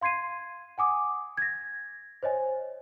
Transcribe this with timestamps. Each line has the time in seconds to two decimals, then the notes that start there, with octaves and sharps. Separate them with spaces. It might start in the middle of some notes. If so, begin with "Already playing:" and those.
0.01 F5 C6 G#6 C7 D#7
0.78 F#5 G#5 D6 D#6
1.38 G#6 A#6
2.23 C5 C#5 D#5 G#5